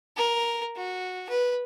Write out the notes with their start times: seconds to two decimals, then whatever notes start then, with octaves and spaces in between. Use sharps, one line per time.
0.17 A#4
0.76 F#4
1.30 B4